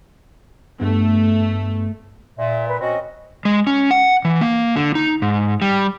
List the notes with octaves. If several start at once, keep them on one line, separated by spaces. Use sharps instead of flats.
G2 A3 B3
A#2 E5
B4
C4 C#4 F#4 D#5
G#3
C#4
F#5
E3
A#3
D3
D#4
G#2
G3